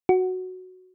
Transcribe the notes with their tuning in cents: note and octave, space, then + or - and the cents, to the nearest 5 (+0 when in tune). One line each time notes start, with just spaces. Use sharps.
F#4 -5